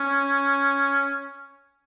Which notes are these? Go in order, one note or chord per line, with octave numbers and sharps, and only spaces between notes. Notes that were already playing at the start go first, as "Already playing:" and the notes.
Already playing: C#4